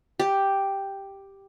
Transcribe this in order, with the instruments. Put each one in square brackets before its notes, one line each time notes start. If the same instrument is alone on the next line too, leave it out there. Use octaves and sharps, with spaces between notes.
[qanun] G4